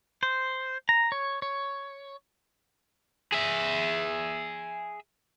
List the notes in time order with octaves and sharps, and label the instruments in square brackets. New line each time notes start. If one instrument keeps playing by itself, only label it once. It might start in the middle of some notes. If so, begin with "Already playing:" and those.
[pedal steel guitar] C5
A#5
C#5
C#5
[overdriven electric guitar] G#4 E5